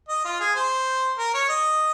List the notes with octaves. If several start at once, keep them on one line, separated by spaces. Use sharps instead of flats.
D#5
F4
G#4
C5
A#4
C#5
D#5